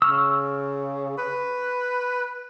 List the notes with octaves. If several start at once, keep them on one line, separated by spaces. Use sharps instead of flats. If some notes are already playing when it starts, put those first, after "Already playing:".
C#3 C#6 E6 F6
B4